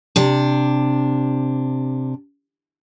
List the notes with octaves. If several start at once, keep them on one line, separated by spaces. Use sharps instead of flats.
C3 D4